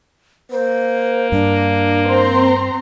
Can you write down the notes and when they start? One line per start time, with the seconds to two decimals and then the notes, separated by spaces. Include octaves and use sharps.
0.51 A#3 C5
1.32 G2 D4
2.07 C4 A#5 C6